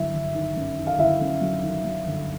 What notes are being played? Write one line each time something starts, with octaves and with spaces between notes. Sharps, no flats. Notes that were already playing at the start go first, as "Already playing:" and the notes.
Already playing: G1 F#3 E4 E5
G1
D#3
F#2
D#3
F5
G1 E4 E5
F#2
F#3
D#3
F#3
G1